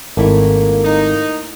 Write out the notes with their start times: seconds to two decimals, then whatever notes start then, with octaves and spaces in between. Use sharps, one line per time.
0.17 G#1 A3 A#3 E4
0.85 D#4